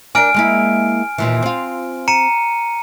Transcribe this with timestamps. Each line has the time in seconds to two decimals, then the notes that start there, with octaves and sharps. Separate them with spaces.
0.15 D4 A#4 D5 G#5 F6 D7
0.34 G#3 A#3 E4
1.18 D#2 A#2 E3
1.42 C4 F4
2.08 A#5 C#7 D#7